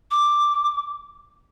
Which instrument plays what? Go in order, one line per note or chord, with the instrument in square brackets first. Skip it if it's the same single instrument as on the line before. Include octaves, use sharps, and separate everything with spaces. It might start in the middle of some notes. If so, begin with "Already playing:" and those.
[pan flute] D6